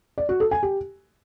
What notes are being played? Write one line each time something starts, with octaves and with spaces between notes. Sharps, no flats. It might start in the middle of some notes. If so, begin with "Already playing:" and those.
D5
F#4
A4
G#5
G4